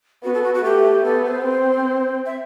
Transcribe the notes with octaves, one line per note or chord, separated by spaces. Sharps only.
B3 F#4
A4
F#4
F#4
A3 G4
B3 A4
C5
C4
E5